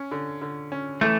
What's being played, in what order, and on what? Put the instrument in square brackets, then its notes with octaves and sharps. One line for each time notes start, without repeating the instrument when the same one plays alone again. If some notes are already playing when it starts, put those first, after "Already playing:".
Already playing: [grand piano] C#4
D3
D3
C#4
[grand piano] E3 [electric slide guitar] A3